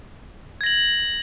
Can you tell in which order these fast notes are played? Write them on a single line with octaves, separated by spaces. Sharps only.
G#6 A#6 F#7